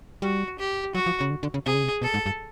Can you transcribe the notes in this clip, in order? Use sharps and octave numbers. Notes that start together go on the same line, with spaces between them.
G3 F#4
G4
F#3 F#4
F3
C#3
D3
D3
C#3
C3 G#4
C#3
C3
B2 A4
G#2
G2